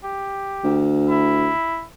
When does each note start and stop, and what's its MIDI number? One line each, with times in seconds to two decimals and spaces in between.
0.04 0.81 67
0.64 1.51 38
1.09 1.83 64